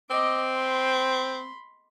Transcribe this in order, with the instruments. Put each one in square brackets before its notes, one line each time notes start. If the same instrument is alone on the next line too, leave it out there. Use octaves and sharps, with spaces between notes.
[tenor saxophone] C4 [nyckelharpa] D#5 D6
[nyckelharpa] B5 C6